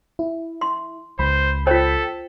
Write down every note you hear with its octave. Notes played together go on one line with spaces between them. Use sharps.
E4
C6
C#2 C5 B5
F4 A4 C5 G5 B6